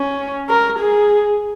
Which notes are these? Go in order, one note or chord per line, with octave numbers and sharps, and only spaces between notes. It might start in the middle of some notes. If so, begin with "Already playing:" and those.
Already playing: C#4
A#4
G#4